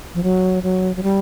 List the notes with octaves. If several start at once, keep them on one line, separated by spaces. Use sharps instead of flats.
F3
F#3
F#3
F#3
G3